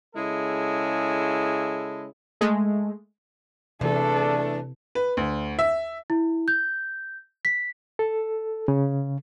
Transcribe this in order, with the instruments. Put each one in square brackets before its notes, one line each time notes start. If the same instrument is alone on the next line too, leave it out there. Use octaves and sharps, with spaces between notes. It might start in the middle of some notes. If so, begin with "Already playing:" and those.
[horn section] C#3 G#3 E4 A4
[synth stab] G#3 A3
[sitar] E2 [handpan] C3 [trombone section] A3 D4 [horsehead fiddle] A4
[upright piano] B4
D2
E5
[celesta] E4
G6
B6
[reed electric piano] A4
C#3